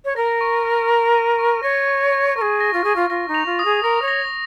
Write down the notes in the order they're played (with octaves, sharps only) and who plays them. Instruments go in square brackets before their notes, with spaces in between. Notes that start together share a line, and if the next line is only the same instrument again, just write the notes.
[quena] C#5
[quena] A#4 [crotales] A#6
[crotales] C#6
A#6
C#6
D#7
C#6
[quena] C#5 [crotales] A#6
[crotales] C#6
C#6
[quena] A#4 [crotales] C#6
[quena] G#4
[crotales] A#6
[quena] F4
[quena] G#4 [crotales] A#6
[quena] F4
[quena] F4 [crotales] A#6
[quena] D#4
[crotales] F7
[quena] F4
[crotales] D#6
[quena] G#4
[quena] A#4 [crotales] A#6
[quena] C#5
[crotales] A#6